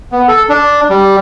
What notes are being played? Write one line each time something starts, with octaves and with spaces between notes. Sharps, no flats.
B3
A4
D4
G3